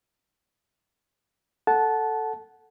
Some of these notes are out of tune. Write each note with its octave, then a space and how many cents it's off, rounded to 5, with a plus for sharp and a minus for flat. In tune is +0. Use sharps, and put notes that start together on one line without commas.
A4 +0 F#5 +0 A5 -15